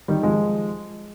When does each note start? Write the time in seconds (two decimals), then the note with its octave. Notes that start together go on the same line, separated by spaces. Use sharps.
0.08 D#3 G3
0.23 F3 G#3